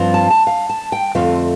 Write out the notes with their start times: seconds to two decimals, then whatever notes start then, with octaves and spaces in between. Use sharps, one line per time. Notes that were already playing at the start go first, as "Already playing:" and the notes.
Already playing: G2 F3 C4 F4
0.14 A5
0.30 A5
0.47 F5
0.69 A5
0.92 G5
1.15 F2 D3 A3 C4 F4 F5